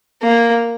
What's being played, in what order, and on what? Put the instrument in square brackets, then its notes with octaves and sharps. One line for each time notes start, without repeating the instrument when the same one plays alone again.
[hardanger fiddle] A#3